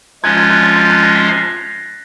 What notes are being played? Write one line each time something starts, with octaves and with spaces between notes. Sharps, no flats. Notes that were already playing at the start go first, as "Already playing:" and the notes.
F3 G#3 C#4 F4 F#6 G#6
F#6 G#6
F#6 G#6
G6 A6
G6 A6
F#6 G#6
G#6 A#6
A6 B6
A#6 C7